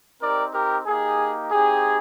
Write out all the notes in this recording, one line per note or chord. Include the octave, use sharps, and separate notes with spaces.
C4 D#4 G4 A#4 D5
G4 A#4
A#3 D#4 G4 G#4
C4 D#4 G4 G#4